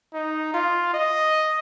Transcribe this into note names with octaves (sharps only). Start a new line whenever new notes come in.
D#4
F4
D#5